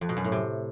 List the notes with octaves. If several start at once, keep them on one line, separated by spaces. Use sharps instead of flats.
F2
B2
F#2
A2
C3